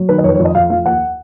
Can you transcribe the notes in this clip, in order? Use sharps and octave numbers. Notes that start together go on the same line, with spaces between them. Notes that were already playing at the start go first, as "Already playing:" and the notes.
Already playing: F#3
D#3 B4
D#5
F2 C#5
B4
C#5
F2
D#5
F2 F5
F3 F5
D#2 F#5